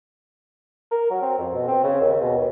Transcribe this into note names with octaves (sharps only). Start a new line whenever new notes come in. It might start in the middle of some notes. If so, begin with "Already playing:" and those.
A#4
F#3
C4
F2
B2
C4
C#3
D#2
B2
D#2